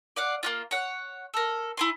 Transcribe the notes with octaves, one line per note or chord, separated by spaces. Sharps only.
D5 F5 F#5
A#3 C#4 F4
C#5 F#5
A4 A#4
E4 G#5 C6